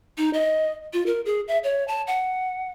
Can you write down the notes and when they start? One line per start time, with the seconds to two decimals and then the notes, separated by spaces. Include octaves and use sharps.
0.18 D#4
0.33 D#5
0.93 F4
1.06 A#4
1.25 G#4
1.48 E5
1.64 C#5
1.88 A5
2.07 F#5